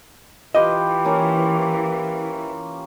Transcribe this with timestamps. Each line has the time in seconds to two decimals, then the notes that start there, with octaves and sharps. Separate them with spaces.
0.55 E3 F4 G4 B4 D#5
1.05 A#3 C#4